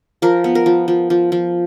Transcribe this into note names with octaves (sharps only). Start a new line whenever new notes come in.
F3 A#4
B3
A#4
F3
F3
F3
F3